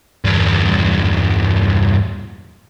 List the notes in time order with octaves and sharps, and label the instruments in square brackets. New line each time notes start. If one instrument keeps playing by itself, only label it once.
[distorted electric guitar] E2 G2